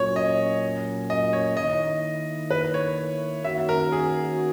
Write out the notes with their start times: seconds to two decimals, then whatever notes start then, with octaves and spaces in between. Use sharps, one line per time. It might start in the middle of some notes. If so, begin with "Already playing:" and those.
Already playing: A#2 F#3 C#4 C#5
0.16 D#5
1.10 D#5
1.33 C#5
1.57 D#3 A#3 E4 D#5
2.51 B4
2.74 C#5
3.44 D#3 A#3 C#4 F#4 E5
3.69 A#4
3.92 G#4